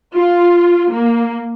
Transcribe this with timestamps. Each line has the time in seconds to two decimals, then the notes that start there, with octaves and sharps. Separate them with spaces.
0.14 F4
0.93 A#3